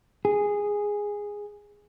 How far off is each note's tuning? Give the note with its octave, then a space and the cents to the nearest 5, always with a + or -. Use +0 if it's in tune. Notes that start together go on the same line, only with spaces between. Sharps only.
G#4 -10